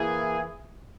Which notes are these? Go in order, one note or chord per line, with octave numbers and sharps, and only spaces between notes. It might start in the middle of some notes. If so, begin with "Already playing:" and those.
Already playing: E3 A#3 E4 G#4